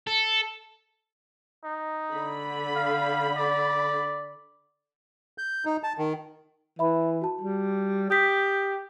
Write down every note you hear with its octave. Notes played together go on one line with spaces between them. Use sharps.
A4
D#4
D3 B5
F5
D5
G6
D#4
A5
D#3
E3 E5 B5
F#4 A5
G3
G4 D#6 G6 B6